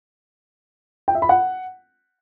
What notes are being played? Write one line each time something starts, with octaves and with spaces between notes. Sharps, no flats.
G5
E5
B5
F#5